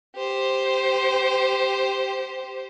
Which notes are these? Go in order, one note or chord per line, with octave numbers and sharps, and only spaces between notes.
G4 C5